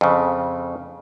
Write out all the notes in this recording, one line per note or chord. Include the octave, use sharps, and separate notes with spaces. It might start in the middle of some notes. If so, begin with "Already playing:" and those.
F2 C#3